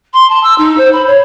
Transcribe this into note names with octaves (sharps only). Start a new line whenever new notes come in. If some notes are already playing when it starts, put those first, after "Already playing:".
C6
A5
E6
D#4
C5
B5
C#5